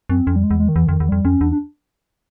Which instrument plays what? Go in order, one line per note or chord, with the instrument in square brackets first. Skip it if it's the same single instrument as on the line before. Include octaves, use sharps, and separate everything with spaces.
[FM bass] F#2 [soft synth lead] C4
[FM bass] F2 [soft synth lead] C#4
[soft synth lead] G3
G#3
[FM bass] E2
[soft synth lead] G#3
D#3
[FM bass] E2 [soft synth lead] E3
[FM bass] F2 [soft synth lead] D3
[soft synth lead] D#3
[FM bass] E2
[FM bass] F2 [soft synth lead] G3
[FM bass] F2 [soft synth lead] C#4
[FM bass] E2 [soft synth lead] D4
[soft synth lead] D4